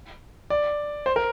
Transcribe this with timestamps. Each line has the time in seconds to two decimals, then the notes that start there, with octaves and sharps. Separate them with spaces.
0.50 D5
1.06 C5
1.16 A#4